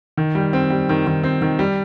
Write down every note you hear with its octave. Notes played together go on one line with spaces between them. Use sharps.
D#3
G3
C4
G3
D#3
D#3
C4
D#3
G3